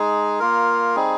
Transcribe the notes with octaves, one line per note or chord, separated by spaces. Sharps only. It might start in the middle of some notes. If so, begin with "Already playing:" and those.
Already playing: G#3 D#4 G#4
A#3 F4 A#4
G3 C4 D#4 G#4